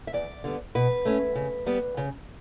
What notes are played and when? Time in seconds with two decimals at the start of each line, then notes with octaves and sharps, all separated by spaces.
0.07 E5
0.13 E2 D5
0.44 D3 G3 B3
0.75 B2 B4
1.05 A3 C#4
1.35 C#3
1.66 G3 B3
1.97 C#3